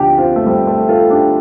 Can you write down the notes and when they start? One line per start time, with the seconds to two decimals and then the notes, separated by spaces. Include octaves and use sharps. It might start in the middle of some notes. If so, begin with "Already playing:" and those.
Already playing: D2 C3 F3 D4 F4 G4
0.18 C4 F4
0.36 A3
0.46 G3 C4
0.67 A3
0.89 F4 A4
1.10 D4 G4